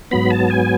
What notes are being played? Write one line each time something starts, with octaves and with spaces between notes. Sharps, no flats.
G#2 F#3 B3 B5
A5
G#5